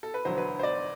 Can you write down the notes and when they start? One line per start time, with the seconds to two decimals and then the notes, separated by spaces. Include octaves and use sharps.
0.03 A4
0.14 B4
0.25 E1 D2 D3 F#3 C5
0.38 B4
0.59 C5
0.63 D5